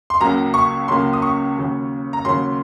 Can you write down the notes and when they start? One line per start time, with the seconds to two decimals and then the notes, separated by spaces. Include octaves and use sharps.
0.10 C6
0.21 C#2 C#3 F#3 A#3 A#5
0.54 C#6
0.88 C#2 C#3 F#3 A#3 C6
1.13 D#6
1.22 C#6
1.57 D#2 C#3 F#3 A#3
2.13 A#5
2.25 D#2 C#3 F#3 A#3 C6